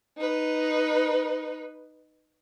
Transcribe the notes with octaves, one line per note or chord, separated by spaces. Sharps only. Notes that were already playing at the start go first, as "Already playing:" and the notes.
D#4 B4